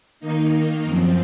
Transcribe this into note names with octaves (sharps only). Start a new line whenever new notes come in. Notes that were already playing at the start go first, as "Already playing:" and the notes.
D#3 A#3 D#4
F#2 F3 C4